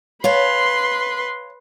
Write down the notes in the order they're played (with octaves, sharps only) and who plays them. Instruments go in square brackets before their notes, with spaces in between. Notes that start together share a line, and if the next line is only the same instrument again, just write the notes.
[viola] B4 C6 [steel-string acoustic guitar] C#5 F5 A5